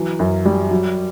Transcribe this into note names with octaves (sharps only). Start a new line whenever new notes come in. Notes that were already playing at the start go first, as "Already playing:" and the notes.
Already playing: E3 F#3
F#2
G3
F#3